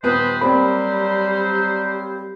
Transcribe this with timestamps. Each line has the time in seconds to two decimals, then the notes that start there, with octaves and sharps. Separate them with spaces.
0.03 D#1 B3 B4 C5 D#6
0.41 F#3 G3 A#3 C4 G4 C5 B5